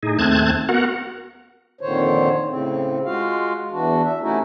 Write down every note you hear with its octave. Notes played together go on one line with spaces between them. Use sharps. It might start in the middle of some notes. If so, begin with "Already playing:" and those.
A2 D#4 G#4
D#2 A3 C4 A5 F#6 G#6
B3 F#4 A#4 F#5
F2 A#2 D3 D#3 C5 C#5
A2 C#3 C4
G#3 F4 F#4 F5
E2 E3 D4 F#4
E5
C3 A3 C#4 D#4 E4 F#4